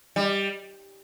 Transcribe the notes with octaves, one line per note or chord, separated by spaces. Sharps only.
G3